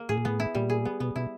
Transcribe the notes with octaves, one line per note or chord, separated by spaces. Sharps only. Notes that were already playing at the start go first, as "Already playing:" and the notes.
Already playing: A#3
A2 G#4
A#2
A2 B3
E4
A#2 G3
G#4
B3
B2 B3
B2 E4